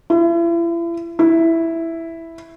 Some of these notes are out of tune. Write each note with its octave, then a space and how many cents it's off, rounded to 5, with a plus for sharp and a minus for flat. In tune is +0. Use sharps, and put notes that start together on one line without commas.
E4 +40
E4 +0